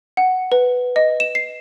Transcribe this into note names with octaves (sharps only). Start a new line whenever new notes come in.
F#5
B4
D#5
E7
C7